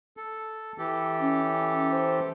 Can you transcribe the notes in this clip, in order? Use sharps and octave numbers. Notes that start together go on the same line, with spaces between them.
A4
E3 G4 A4
C#4
C5